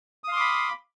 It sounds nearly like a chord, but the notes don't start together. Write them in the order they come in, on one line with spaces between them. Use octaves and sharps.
D#6 F5 C6 D6 B5